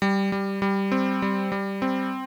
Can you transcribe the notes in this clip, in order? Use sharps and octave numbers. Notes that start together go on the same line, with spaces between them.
G3
G3
G3
C4
G3
G3
C4